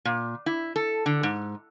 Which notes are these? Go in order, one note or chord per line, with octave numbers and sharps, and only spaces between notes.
A#2
E4
A4
D3
G#2